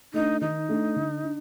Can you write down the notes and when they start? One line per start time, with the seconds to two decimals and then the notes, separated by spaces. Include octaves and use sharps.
0.14 A3 D4 D#4
0.41 D#3 D#4
0.69 A3 D4
0.96 D3
1.23 D4